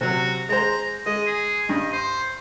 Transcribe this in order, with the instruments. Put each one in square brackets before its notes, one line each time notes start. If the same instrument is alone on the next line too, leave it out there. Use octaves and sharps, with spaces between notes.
[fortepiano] C3 F#3 [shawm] F#4
[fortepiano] G#3 C5 [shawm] A#5
[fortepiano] G#3 [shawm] D#5
[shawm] G#4
[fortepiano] G2 [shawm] D#5
[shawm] C5